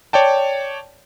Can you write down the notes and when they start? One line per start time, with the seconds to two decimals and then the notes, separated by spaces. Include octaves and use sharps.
0.13 C#5 D5 G5 A5